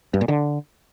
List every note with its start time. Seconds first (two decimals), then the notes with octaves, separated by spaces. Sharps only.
0.14 G2
0.21 A#2
0.28 D3